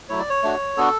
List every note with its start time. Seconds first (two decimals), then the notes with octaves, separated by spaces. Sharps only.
0.09 F#3 A3 E4 C#5
0.19 D5
0.30 C#5
0.43 A3 D4 F#4
0.77 B3 D4 F#4 A4